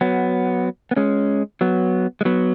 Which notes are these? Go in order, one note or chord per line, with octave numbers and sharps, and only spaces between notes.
F#3 B3
B3
G#3 C#4
F#3 B3
G#3
F#3 B3